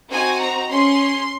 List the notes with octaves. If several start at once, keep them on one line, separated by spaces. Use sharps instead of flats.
C4 D#4 F#4 G#5
A#5
C#4 G#4 C6